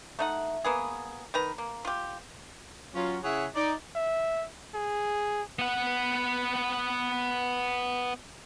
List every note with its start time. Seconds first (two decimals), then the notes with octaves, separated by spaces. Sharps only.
0.19 A3 D#4 F#5
0.64 A#3 B3 G#4
1.34 D#3 B4 A#5
1.58 A#3
1.85 F4 G4
2.95 F#3 C#4 F4
3.23 C#3 E4 G#4 C#5 E5 F#5
3.56 D#4 D5
3.95 E5
4.74 G#4
5.59 B3 F#5